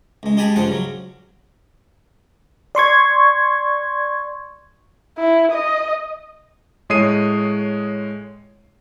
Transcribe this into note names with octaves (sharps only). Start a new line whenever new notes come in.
C#2 G#3
G#3 G4 G#4 G#5 A5 B5
C#2 G2 C#3 F3 C5 F#5
C#3 F#3
D5 C6 C#6 G#6
E4
D#5
A2 G#3 C#5 D#6 C7 D#7